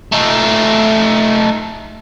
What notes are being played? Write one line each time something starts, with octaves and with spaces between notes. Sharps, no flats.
A3 D#4